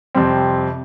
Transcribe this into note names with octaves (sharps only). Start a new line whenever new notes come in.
F2 C3 G3 C4